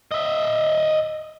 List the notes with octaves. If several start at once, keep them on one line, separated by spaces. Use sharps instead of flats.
D#5 E5